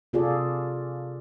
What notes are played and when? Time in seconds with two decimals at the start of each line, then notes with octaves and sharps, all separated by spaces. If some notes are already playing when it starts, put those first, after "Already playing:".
0.13 C3 F4 G#4 A4 D5